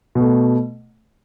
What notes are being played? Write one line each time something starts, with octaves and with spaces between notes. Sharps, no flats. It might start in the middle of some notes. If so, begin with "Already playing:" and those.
B2 A3